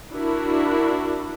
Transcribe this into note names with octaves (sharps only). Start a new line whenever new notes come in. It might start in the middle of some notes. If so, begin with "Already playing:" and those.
D4 E4 F#4 A#4